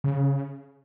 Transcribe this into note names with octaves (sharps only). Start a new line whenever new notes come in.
C#3